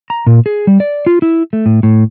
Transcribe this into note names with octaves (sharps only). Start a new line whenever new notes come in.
A#5
A#2
G#4
G3
D5
F4
E4
A3
A2
A2